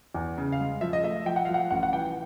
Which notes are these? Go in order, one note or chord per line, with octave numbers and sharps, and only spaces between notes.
E2
C#3
F5
G#3
F3 E5
D#5
A3 E5
F3 G5
F#5
F3 F5
F#5
A1 F#5
F#5
E3 G5